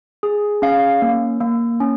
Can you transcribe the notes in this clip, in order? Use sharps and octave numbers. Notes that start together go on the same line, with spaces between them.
G#4
C#4 F5
A#3
A#3
C#4